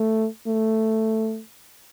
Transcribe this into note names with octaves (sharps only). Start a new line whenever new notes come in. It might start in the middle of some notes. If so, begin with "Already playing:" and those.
Already playing: A3
A3